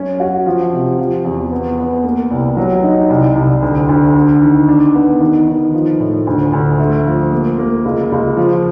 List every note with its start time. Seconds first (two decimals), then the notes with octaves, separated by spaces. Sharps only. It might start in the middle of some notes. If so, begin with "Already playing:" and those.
Already playing: F#2 C#4
0.20 F#4
0.46 F3
0.73 C3
0.99 F3
1.25 E2
1.52 B3
1.78 B3
2.04 A#3
2.31 C2
2.57 F#3
2.83 D#4
3.10 C2
3.36 C2
3.62 D2
3.89 D2
4.15 D4
4.42 D#3
4.68 D4
4.95 B3
5.20 D#3
5.48 D#3
5.74 F3
6.00 A2
6.27 D2
6.53 D2
6.80 A3
7.06 F3
7.32 A#3
7.58 A#3
7.85 C#2
8.12 C#2
8.37 F3